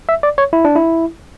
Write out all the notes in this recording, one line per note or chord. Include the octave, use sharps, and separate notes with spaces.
E5
D5
C#5
E4
D4
E4